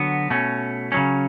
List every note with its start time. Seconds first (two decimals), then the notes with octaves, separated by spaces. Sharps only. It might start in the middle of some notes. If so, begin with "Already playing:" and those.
Already playing: D3 F#3 B3 F#4
0.30 B2 A3 C#4
0.92 C#3 F#3 C#4